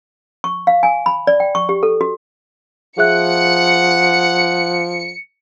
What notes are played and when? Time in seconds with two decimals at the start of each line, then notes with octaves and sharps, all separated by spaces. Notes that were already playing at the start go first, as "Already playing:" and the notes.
0.44 C#6
0.67 F5
0.83 G#5
1.06 B5
1.27 D5
1.40 G5
1.55 C#6
1.69 G4
1.83 A4
2.01 F#4
2.98 F3 G#4 E5 F#5 F#6 C#7